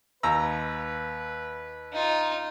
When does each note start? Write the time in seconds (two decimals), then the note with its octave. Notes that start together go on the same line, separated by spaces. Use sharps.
0.23 D#2 B4 A#5 E6
1.93 D#4 F4